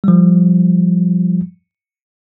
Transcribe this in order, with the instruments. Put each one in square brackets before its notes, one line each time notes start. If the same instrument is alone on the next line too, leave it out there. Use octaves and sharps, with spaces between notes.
[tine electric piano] F3 G3